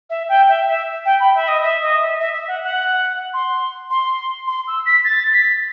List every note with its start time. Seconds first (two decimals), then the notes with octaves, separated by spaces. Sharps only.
0.10 E5
0.29 G5
0.49 E5
0.67 E5
1.05 G5
1.20 B5
1.35 E5
1.48 D#5
1.63 E5
1.82 D#5
2.00 E5
2.19 E5
2.34 E5
2.48 F#5
2.63 F#5
3.33 C6
3.90 C6
4.47 C6
4.67 E6
4.86 B6
5.04 A6
5.33 B6